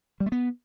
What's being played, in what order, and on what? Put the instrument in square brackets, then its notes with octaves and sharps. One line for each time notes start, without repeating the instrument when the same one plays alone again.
[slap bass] G3
A3
B3